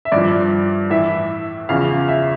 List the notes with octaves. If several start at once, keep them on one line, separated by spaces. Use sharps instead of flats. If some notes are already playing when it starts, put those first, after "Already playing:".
E5
G2 F3 D5
A2 E3 E5
E2 C#3 F3 F5
E5